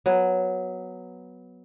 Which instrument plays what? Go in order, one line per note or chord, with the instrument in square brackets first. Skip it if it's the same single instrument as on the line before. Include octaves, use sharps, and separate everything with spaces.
[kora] F#3 B3